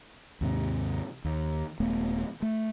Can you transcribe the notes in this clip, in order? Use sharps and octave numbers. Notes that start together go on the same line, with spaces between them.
D#2 G#2 C3
D#2
D#1 A3 B3
A3